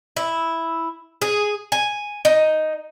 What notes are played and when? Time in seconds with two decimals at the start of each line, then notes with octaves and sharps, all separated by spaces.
0.16 E4
1.22 G#4
1.72 G#5
2.25 D#4